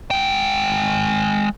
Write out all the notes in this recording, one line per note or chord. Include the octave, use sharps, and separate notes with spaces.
G#3 G5